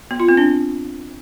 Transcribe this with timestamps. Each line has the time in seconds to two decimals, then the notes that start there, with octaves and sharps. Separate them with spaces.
0.11 B3
0.20 F4
0.29 C4
0.37 D4